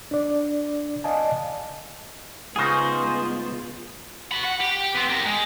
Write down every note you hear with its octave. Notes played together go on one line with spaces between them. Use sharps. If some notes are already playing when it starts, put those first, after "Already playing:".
D4 D5
D5 D#5 F5 G#5 A5
C#3 G#3 B3 D#4 F4 G#4 C5 F#5
F#4 B5
F#5
G4
B3 C4
G4 A#4
G#3